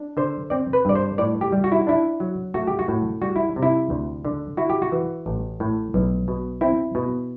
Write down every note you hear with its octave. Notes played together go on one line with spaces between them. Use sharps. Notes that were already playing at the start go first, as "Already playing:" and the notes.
Already playing: D4
D3 C5
C4 D5
B4
G2 D5
C5
A2 D5
G4
G3
F#4
E4
D4 E4
F#3
A3 F#4
G4
F#4
A2
G3 F#4
E4
C3
E4
D2
D3
E4 F#4
G4
F#4
E3
A1
A2
B1
B2
C4 E4
B2